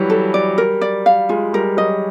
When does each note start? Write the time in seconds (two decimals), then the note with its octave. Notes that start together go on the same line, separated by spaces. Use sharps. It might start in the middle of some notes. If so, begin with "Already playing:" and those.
Already playing: E3 F#3 G3
0.10 A4
0.34 D5
0.58 A#4
0.81 D5
1.06 F5
1.29 G#3 F4
1.53 G3 A#4
1.77 F#3 D#5